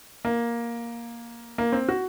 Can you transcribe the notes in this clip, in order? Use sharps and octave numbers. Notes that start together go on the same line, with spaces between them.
A#3
A#3
C4
F#4